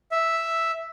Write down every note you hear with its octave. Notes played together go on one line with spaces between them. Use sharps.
E5